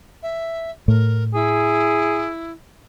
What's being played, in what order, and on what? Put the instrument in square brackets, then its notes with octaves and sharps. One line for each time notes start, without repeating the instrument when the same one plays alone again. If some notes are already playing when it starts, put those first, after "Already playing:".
[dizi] E5
[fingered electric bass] A2 A3 [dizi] A#4
[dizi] E4 [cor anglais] G#4